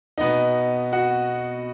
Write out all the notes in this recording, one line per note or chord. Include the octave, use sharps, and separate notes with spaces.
B2 B3 D#4 D#5
F#4 F#5